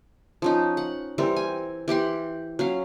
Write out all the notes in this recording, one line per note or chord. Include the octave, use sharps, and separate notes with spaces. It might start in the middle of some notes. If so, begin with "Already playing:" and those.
F3 C#4 D#4
F#5
E3 G3 C4 A#4
G#5
E3 G4 F#5 C6
F#3 C#4 F5